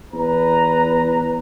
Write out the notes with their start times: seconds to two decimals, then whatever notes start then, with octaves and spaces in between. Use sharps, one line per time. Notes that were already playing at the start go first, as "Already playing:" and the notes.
0.12 E2 B4 A#5